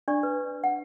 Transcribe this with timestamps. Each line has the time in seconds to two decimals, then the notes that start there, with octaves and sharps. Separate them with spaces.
0.08 D4 D5 C#6
0.23 B4
0.64 F#5